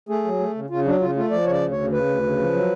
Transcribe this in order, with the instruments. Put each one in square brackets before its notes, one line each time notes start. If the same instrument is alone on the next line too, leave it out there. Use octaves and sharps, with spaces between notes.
[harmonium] A3 G#4
F#3
A3
C#3
C#3 F4
F#3 D4
C#3 F4
A3 F4
F3 D5
C#3 C#5
D5
D2
C#3 C#5
C#3 B4
D2
C#3
F3
F#3